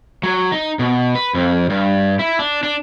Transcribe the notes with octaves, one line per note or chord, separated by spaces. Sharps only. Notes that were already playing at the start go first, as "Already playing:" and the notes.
F#3
D#4
B2
B4
F2
G2
E4
D4
D4